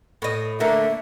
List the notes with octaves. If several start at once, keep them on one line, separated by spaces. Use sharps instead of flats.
A2 D#5
D3 A3 A#3 E5